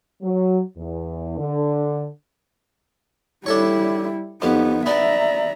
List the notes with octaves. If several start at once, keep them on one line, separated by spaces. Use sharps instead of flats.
F#3
E2
D3
G3 D4 E4 A4 C#5
F2 B3 D#4 G4
B3 D5 E5 A#5